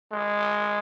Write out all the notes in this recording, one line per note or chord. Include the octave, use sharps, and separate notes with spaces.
G#3